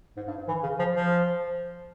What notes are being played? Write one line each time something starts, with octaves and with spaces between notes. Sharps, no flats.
G#2
G2
G#2
E3
C#3
F3
F3